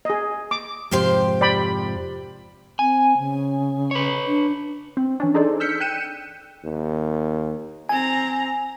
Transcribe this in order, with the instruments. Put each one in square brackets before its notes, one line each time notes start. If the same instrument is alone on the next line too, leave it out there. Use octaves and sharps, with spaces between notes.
[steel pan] G#4 D#5
D6
[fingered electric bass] F2 G#2 C3 [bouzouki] F3 G4 C5
[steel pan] D5 G5 B5
[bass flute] C4 [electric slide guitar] G#5
[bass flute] C#3
[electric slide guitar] B4 C#5
[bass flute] D4
[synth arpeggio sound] C4
E3 C#4 D4
D4 D#4 G#4 A4 C5 D5
E6 F6 G6 B6 C#7
G5 F#6 G6 C#7 D#7 E7
[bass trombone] D#2
[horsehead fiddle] C4 A#5 [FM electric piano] G#5